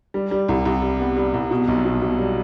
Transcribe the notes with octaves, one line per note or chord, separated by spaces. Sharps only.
G3
G3
C2
C2
G3
B3
G3
C2
B2
B1
B2
B2
G3